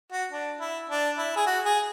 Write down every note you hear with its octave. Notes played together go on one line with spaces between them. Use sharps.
F#4
D4
E4
D4
E4
G#4
F#4
G#4